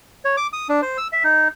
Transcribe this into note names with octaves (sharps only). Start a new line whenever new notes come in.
C#5
D6
D#6
D4
C5
E6
E5
D#4